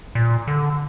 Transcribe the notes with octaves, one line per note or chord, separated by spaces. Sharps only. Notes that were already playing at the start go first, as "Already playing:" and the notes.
A#2
D3